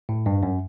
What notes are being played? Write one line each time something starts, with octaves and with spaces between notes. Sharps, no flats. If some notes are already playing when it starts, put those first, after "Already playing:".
A2
G2
F#2